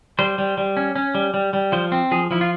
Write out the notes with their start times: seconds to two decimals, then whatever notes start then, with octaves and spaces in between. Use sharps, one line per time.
0.19 G3 C5
0.38 G3
0.58 G3
0.77 C#4
0.96 C#4
1.15 G3
1.34 G3
1.53 G3
1.72 F3 C5
1.92 C4
2.11 F3 G#4
2.31 F3 E4
2.41 F4